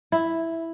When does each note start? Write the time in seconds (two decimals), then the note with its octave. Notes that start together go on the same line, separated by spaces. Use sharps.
0.12 E4